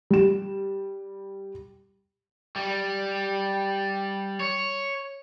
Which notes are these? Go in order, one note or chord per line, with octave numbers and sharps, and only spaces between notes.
G3 E7
G3
C#5